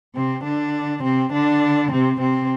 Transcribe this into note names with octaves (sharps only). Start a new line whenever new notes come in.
C3 C4
D3 D4
C3 C4
D3 D4
C3 C4
C3 C4